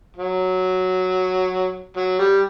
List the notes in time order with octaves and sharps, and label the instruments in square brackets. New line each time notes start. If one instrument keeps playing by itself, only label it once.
[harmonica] F#3
F#3
G3